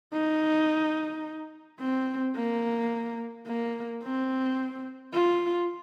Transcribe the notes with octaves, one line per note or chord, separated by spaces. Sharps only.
D#4
C4
A#3
A#3
C4
F4